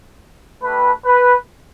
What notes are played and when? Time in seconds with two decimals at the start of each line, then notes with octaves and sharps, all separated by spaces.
0.62 A3 D4 G4 B4
1.05 B4